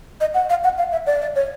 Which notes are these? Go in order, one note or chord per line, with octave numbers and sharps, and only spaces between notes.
D#5
F#5
F5
F#5
F5
E5
D5
D5
C#5